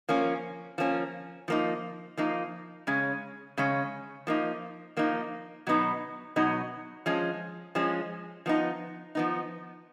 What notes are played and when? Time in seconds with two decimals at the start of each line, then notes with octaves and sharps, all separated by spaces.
0.09 F3 A#3 C#4
0.78 F3 A#3 C#4
1.48 F3 A#3 D#4
2.17 F3 A#3 D#4
2.87 C#3 G#3 C#4
3.57 C#3 G#3 C#4
4.27 F3 A#3 D#4
4.97 F3 A#3 D#4
5.67 B2 F#3 B3 D#4
6.36 B2 F#3 B3 D#4
7.06 F3 G#3 C#4
7.75 F3 G#3 C#4
8.46 F3 B3 D#4
9.15 F3 B3 D#4